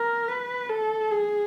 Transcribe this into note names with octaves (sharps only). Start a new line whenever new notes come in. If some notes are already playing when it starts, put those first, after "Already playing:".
Already playing: A#4
B4
A4
G#4